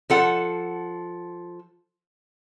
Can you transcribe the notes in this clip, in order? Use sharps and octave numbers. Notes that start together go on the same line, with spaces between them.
F3 A4 F#5